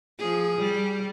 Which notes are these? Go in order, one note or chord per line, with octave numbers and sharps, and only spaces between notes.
F3 G#4
G3